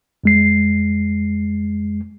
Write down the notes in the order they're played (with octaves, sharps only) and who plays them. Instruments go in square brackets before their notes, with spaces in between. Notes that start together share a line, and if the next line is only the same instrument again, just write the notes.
[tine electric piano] F2 G#3 C7